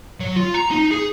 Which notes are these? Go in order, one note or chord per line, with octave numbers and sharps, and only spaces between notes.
F#3
F4
A#5
D#4
G#4